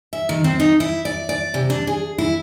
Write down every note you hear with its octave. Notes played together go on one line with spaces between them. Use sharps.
E5
D#3
C4
D#4
E4
D5
D5
C3
D4
G#4
E4